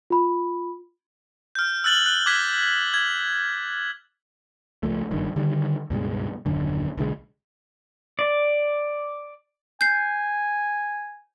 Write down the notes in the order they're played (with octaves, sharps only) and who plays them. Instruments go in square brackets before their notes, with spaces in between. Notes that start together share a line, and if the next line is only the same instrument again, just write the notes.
[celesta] F4 B5
[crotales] F6 G6
E6 F#6 A6 F#7 G7
F#6 G7
D6 F#6 G#6 B6
G#6
[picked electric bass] C#2 F3 A3
F#1 G2 D#3
D3 D#3 G3
C#2 G2 B2 G#3
D#1 F#2 D3
B1 D3 E3 G#3
[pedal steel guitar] D5
[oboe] G#5 [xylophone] G6 C7